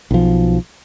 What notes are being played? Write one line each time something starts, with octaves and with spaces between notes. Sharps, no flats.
B1 F3